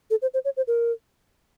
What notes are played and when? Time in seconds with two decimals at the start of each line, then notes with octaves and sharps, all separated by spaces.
0.10 A4
0.22 C5
0.34 C5
0.45 C#5
0.57 C5
0.68 A#4